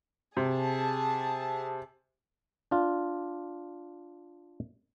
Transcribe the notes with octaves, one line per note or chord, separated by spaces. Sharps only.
C3 G#4 A5
D4 F4